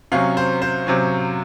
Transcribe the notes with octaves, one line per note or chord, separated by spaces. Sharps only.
C3 F#3 C#4 F5
C5
C5
C3 F#3 C#4